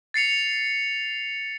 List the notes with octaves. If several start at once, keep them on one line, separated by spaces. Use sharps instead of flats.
A6 C7 C#7 F7